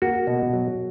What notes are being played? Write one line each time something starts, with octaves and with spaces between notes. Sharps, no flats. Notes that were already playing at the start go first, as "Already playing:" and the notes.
A#3 F#4
B2
F#3